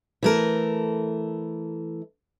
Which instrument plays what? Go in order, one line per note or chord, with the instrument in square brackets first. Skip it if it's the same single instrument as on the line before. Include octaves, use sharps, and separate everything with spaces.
[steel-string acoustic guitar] E3 A3 A#4